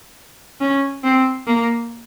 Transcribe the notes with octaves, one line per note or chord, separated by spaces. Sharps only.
C#4
C4
A#3